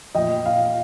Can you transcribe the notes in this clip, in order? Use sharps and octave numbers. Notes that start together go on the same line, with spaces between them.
A#2 F3 D#5 G5
F5